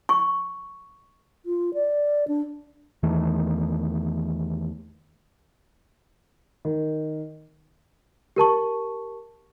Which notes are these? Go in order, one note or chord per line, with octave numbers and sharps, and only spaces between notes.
C#6
F4
D5
D4
E2 D#3 E3 A3
D#3
G4 A#4 A5 C#6